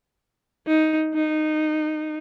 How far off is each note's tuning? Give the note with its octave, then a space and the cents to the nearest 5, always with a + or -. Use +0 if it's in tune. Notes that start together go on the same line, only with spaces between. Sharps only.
D#4 +10
D#4 -15